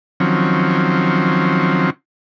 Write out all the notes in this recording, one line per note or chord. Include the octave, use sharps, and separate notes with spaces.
D#3 F3 F#3 C4 C#4